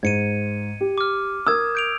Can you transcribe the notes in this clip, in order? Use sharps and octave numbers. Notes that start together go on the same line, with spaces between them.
G#2 G#6 C#7 D#7
G4
D6 F6
A#4 D#6 E6 G#6
G6 D7 F7